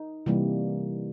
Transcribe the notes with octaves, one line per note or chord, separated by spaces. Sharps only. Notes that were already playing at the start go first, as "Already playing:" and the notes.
Already playing: D#4
C3 E3 G3 A#3